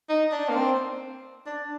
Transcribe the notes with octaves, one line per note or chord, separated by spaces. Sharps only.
D#4
D4
A#3
C4
D4